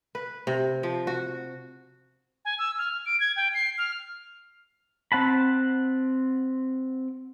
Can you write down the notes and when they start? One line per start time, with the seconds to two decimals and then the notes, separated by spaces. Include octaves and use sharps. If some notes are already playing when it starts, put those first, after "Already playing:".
0.15 B4
0.47 C3
0.83 F3
1.07 F#4
2.45 G#5
2.59 E6
2.78 F6
3.06 D7
3.20 G#6
3.36 G5
3.54 C7
3.78 F6
5.12 C4 F#5 A5 B5